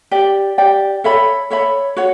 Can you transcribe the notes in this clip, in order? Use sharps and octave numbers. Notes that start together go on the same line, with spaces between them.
G4 D5 G5
G4 D5 G5
A4 C#5 E5 B5
A4 C#5 E5 B5
F#4 C#5 F#5